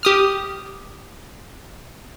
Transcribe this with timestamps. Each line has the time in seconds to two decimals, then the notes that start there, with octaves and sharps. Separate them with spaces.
0.03 G4 D#6 F6